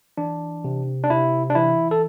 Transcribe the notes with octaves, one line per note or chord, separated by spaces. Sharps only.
E3 D4
C3
D4
C3 E4
D4
E3 E4
A4